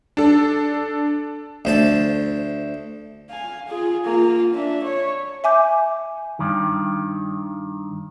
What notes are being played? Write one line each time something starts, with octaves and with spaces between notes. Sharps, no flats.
D4 A4
D2 C5 A5
F5 G#5
F4 G#4
A#3 F4
D4 E5
C#5
E5 G#5 D6 G6
G2 D#3